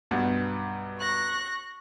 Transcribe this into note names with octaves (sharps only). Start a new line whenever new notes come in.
B1 G2 F#5
C#6 F#6 A#6